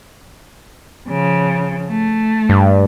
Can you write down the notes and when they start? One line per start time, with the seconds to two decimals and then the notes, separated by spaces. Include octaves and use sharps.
1.09 C#3 F3
1.89 A3
2.49 G2